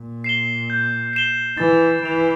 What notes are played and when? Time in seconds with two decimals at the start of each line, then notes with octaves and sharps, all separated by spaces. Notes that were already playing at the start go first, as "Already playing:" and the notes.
Already playing: A#2
0.24 C7 E7 G7
0.70 G6
1.13 C7 E7 G7
1.57 E3 A6
2.03 E3 D7 F7